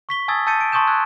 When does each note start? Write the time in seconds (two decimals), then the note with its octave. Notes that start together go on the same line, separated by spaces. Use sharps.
0.09 C#6 B6 G7
0.28 G#5 A5 D#6 E6 G#6 A6
0.47 A5 E6 G6 A6 C#7 D#7
0.61 D7
0.72 A5 C6 C#6 D#6 G6 E7
0.87 E6 F#6 G#6